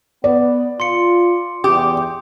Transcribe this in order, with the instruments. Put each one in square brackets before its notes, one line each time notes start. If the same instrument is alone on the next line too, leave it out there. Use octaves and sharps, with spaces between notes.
[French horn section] B3 [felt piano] D5
[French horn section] F4 [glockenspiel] C6 C#7
[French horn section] E2 [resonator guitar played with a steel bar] G4 [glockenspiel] D#6